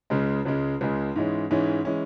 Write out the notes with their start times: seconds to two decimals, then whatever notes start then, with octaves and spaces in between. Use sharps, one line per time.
0.10 C#2 C#3 G#3
0.45 C#2 C#3 G#3
0.81 C#2 C#3 G#3
1.16 G#2 E3 G#3 C#4
1.50 G#2 E3 G#3 C#4
1.85 E3 G#3 C#4